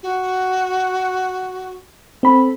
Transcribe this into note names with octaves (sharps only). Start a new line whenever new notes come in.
F#4
C4 A4 B5